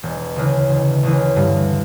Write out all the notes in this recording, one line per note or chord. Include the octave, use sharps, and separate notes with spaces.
E1
D2 C#3 E3
E1
D2 C#3 E3
G2